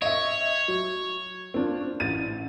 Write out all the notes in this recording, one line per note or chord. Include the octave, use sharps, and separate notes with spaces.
C#5 D#5 E5
F#3
C4 D4 F4
A1 A6 D#7